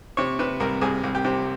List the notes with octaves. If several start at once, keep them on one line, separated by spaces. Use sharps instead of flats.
C3 C#5
C3 B4
C2 A#4
C2 G#4
C2
G4
C3